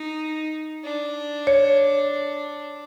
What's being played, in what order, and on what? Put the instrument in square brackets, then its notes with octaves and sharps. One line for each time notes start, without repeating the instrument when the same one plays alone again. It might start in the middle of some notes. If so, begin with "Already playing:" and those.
Already playing: [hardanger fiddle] D#4
D4
[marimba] C#5